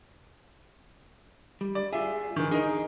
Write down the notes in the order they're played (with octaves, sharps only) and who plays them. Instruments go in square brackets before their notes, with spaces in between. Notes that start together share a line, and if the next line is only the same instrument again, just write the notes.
[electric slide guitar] G3
[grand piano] D5
[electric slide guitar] F4 G#4 [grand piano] E5
[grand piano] D#3 E3
[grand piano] D#4 A#4 [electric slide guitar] G#4 D#5